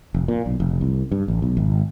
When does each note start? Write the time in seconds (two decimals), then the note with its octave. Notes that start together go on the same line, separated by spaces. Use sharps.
0.14 F1
0.28 A#2
0.46 B1
0.60 F1
0.81 C2
1.12 G2
1.28 A1
1.42 B1
1.57 G#1